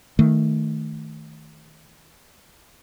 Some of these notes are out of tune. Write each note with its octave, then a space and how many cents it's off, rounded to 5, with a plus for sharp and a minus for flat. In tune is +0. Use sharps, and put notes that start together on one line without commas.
D#3 +5 A3 +0